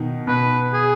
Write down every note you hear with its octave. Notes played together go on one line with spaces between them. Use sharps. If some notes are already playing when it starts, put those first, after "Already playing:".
Already playing: B2 D#3 D#4
B2 B4
G#4